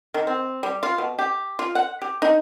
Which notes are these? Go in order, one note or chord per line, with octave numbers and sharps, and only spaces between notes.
D#3
C4
G3
F4
B2
G4
F4
F#5
G4
D#4